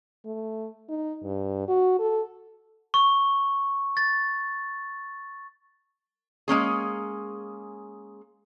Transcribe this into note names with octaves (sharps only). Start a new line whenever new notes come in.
A3
D#4
G2
F#4
A4
C#6
A6
G#3 A#3 C#4 G#4